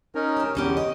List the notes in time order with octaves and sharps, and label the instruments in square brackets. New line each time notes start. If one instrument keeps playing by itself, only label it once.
[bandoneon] C#4 D#4 A#4
[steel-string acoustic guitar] G4 E5
[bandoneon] E2 [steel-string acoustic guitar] D3 C#4 G4
[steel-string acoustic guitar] D#5